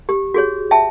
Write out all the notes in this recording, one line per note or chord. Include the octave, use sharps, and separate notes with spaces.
G4
F#4 G#4 C#5
E5 G5 A5